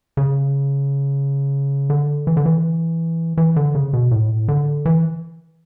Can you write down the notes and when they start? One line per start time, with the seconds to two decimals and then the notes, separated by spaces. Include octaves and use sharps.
0.17 C#3
1.90 D3
2.27 E3
2.37 D3
2.45 E3
3.37 E3
3.56 D3
3.75 C#3
3.93 B2
4.11 A2
4.48 D3
4.86 E3